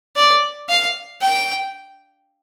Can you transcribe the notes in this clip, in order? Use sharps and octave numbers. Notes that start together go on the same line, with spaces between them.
D5
F5
G5